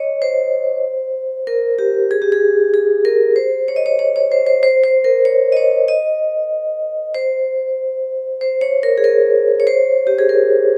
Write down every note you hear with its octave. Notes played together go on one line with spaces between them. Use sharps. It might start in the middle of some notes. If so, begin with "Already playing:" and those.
Already playing: C#5 D#5
C5
A#4
G4
G#4
G4
G#4
G#4
A#4
C5
C#5
D#5
C#5
C#5
C#5
C5
C5
C5
C5
A#4
C#5
D#5
C#5
D#5
C5
C5
C#5
A#4
G#4
A#4
C#5
C5
G4
G#4
A#4